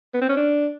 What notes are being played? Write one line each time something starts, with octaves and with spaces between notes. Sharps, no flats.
B3
C4
C#4
D4